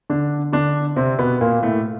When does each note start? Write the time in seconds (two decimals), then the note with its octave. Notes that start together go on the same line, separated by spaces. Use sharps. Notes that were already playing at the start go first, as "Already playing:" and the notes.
0.10 D3 D4
0.53 D3 D4
0.96 C3 C4
1.19 B2 B3
1.41 A#2 A#3
1.62 A2 A3